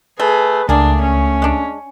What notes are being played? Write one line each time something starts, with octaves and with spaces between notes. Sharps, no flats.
A3 G#4 B4
C#2 A3 A#3 D4 G#4
C#4
G#3 D4